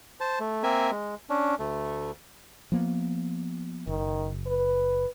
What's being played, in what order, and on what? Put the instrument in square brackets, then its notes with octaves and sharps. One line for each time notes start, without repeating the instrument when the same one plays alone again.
[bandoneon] C5 A5
A3
A#3 C4 A#4 E5 G#5
G#3
C#4 D4
D2 A3
[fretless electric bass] F3 A#3 B3
[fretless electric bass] F#1 [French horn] D#3
[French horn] B4